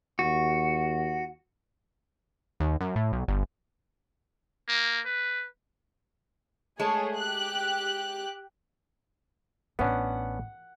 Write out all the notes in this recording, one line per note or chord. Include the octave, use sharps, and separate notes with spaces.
D#2 F#4
D#2
F#2
A2
B1
G1
A#3
B4
G#3 A3 G#4 C#5 A5
G4 F#6
A1 B3 C#4 D4 F#5